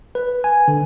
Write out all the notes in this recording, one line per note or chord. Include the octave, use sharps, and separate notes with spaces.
B4
G#5
D3